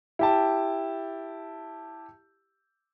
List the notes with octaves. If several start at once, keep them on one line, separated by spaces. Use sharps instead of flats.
E4 G4 A5